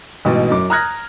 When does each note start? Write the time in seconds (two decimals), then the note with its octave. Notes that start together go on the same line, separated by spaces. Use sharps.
0.25 A1 G#2 B2
0.51 F#2 D6
0.70 A#5 D#6 F6 F#6 G#6 A#6